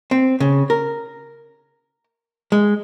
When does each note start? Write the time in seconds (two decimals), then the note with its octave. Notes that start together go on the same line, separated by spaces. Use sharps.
0.11 C4
0.40 C#3
0.70 A#4
2.52 G#3